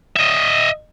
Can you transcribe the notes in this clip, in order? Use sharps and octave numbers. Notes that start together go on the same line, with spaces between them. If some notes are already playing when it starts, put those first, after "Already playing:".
D#5 E5